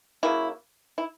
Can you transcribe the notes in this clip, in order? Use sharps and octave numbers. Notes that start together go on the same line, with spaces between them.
C#3 F#3 A#3 E4
E4